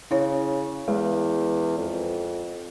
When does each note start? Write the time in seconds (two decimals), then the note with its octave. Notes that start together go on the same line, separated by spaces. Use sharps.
0.11 C#3 E4 C#5
0.88 E2 G#3
1.78 F2